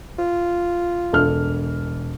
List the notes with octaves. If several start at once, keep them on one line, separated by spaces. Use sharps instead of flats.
F4
E1 A4 F6